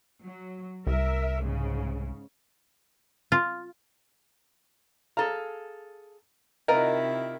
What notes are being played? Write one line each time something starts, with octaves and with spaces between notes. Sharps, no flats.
F#3
C2 A#4 E5
G#2 C#3
F4
G#4 A4 F5 A#5
C3 D#3 E4 F4 A#4 D#5 F#5